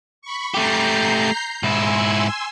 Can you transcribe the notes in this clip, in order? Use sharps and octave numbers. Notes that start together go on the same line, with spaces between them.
B5 C#6
A3 G4 A#5 G6 C7
G#2 E4 G#5 C6 E6